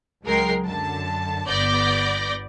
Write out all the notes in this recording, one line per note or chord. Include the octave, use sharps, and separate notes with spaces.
C#2 F#3 G#3 A#4 G5 C7
F#2 D3 A5
G1 B3 D5 G6 A#6